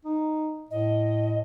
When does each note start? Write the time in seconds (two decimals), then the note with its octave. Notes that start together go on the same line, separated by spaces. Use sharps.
0.05 D#4
0.71 A2 D#5